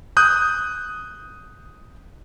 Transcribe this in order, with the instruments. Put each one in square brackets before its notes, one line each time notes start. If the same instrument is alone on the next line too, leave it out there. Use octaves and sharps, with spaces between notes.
[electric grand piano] D#6 F#6 G6